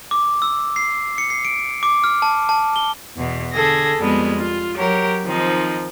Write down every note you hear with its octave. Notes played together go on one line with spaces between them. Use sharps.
D6
E6
C7
C#7
C7
D7
D6
F6
A5
A5
G7
E2 B2
D3 G#4 A4 G#6 A#6
F2 G3 G#3 B3
F4
F#3 G4 A#4 C#5
D#3 F3 C4 D#4